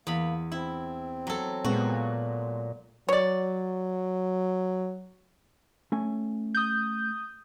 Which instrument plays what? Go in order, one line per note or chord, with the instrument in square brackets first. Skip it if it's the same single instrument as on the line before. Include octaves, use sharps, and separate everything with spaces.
[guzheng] E2 B5 [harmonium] A#3
[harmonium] C4 [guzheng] E4
[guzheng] F#3 A4
[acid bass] A#2 [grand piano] G#3 B3 [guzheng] F#4
[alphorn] F#3 [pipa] C#5 D5
[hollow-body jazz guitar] A3 C#4 G#5
[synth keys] D#6 G6